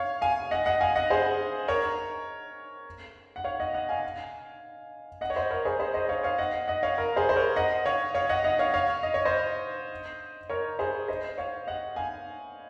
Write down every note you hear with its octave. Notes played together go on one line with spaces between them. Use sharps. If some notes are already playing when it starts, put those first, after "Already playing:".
Already playing: C#5 F5
F5 G#5
D#5 F#5
D#5 F#5
F5 G#5
D#5 F#5
G#4 C5
A#4 C#5
F#5
C#5 F5
D#5 F#5
D#5 F#5
F5 G#5
D#5 F#5
C#5
C5 D#5
A#4 C#5
G#4 C5
G#4 C5
C5 D#5
C#5 F5
C#5 F5
D#5 F#5
D#5 F#5
C#5 F5
A#4
G#4 C5
C5
A#4 C#5
D#5 F#5
C#5 F5
C#5 F5
D#5 F#5
D#5 F#5
C#5 F5
C#5 F5
D#5
C#5
C5 D#5
A#4 C#5
G#4 C5
C5 D#5
C#5 F5
D#5 F#5
F5 G#5